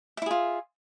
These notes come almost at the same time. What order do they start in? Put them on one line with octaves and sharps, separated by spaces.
E5 E4 G#4 F4